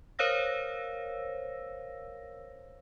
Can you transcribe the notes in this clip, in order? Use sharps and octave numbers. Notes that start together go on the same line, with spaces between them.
A#4 C5 C#5 F5 E6 A#6